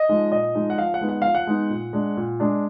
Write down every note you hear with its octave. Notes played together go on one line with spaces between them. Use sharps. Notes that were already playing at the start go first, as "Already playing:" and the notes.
Already playing: D#5
F3 G#3 D#4
A#2 D#5
F3 G#3 D#4
F#5
F3 F5
F#5
G#3 B3 D#4
F#5
F3 F5
F#5
G#3 B3 D#4
A#2
G#3 D4
A#2
G#3 D4